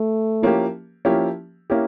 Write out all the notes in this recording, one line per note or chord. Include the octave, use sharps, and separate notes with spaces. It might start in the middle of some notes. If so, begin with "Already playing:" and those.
Already playing: A3
F3 A#3 C#4 E4 G4
F3 A#3 C#4 E4 G4
A#3 C#4 E4 G4